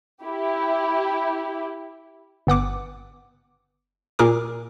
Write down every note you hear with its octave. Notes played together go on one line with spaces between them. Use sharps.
E4 G4
G1 B3 F#5 D6
A#2 G#4 A#4 D6